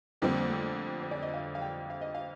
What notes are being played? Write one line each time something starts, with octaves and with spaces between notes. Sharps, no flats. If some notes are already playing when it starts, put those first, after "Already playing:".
F2 D3 G3 A#3 C4
A#3
A3
C5
D5
D#5
F5
F5
G5
F5
D#5
F5